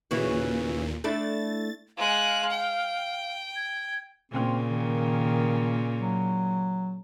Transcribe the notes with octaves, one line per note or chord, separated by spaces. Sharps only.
D#2 A#2 C#3 E3 F#4
A3 D4 E4 A6
G#3 F5 F#6
G5
G#6
A#2 C#3 C4
D#3
F#3